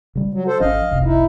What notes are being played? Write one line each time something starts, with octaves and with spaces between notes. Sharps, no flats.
C#3 G3
F#3
A4 C5
G#1 F3 C#4 D#5 F5
F1 C2 C3
D#4 E4